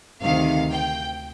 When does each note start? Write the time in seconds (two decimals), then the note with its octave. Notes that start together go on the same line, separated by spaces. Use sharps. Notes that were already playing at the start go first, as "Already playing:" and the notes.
0.21 D2 C3 D#3 F5
0.71 G5